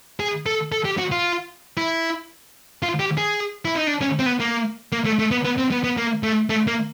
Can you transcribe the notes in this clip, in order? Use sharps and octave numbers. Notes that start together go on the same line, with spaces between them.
G#4
A4
A4
G4
F#4
F4
E4
F4
G4
G#4
E4
D#4
D4
C#4
C4
B3
A#3
A#3
A3
A3
B3
B3
C4
B3
B3
A#3
A3
A3
A#3